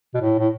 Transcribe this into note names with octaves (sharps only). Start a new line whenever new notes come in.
B2
A2
A2